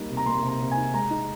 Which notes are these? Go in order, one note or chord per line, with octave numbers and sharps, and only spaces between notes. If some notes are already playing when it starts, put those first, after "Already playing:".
Already playing: G3 A#3 D#4
C3
A#5
A#3 C6
C3
A#5
C3
G#5
D#4
G#3 A#5
D#4